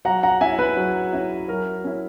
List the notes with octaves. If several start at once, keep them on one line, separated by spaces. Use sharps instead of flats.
F#3 F#5 A#5
F#5 A#5
C#4 E4 E5 G#5
B4
F#3
C#4 E4
F#3 A#4
C#4 E4